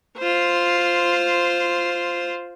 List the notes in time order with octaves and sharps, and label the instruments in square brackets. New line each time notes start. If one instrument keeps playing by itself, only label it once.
[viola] F4 C5